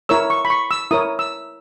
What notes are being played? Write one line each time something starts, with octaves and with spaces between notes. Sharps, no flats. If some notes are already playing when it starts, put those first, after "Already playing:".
E4 A#4 C#5 E6
C#6
B5
C#6
E6
E4 A#4 C#5 D#6
E6